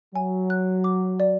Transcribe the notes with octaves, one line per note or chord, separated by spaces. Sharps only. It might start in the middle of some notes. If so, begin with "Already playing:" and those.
F#3 G#5
F#6
D6
D5